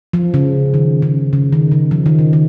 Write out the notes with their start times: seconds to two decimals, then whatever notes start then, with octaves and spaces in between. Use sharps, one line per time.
0.13 F3
0.34 C#3
0.74 D#3
1.02 C#3
1.33 C#3
1.53 D#3
1.71 C#3
1.91 F3
2.06 D#3
2.19 C#3
2.33 D#3